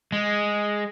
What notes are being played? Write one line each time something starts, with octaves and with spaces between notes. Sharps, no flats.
G#3